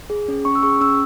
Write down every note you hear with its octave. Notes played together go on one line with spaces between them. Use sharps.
G#4
C#4
C#4 C#6
E6
G#4 C#6
C#4 E6